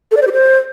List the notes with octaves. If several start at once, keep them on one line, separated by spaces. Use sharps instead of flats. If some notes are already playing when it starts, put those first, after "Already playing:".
A4
D5
C5
G4
C5